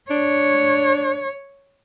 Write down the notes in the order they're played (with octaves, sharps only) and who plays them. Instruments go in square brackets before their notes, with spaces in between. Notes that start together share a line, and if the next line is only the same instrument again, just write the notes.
[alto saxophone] D4 [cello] C#5